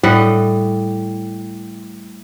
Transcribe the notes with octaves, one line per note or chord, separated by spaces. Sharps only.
A2 G3 D#5 F#5